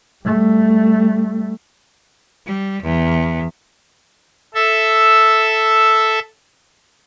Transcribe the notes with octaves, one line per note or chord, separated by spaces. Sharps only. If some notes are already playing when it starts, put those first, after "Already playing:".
G3 A3
G3
E2
A4 E5